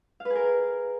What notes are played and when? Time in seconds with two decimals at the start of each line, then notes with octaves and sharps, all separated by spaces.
0.20 F5
0.25 B4
0.30 G#4
0.35 A#4